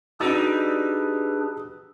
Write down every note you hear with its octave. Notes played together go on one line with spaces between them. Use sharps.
G3 D4 D#4 F#4 G#4 B4 E6 A6